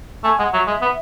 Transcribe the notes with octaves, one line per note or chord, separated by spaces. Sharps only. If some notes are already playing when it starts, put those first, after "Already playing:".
A3 G#5
G#3 F#5
F#3 E5
G#3
B3